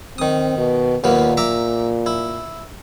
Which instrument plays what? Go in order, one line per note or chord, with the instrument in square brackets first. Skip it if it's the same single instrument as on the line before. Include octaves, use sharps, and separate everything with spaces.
[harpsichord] D#3 D#6 [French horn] C4
[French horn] B2
[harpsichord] D#2 A#3 B3 [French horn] A#2
[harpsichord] E5 A#5 D6
E4